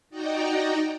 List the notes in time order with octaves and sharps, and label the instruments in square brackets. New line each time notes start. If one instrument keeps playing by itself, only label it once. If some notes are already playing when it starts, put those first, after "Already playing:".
[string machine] D#4 F#4 D5 D#5 G5 A#5